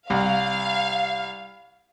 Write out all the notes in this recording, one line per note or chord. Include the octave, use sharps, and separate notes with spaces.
C2 F5